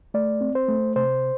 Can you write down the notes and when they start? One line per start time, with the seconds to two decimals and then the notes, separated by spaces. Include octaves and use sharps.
0.14 A3 D5
0.41 C4
0.55 C5
0.68 A3
0.96 C3 C5